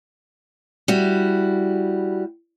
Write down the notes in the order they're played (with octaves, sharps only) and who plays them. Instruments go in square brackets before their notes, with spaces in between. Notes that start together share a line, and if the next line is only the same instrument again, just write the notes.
[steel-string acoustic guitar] G3 E4 F#4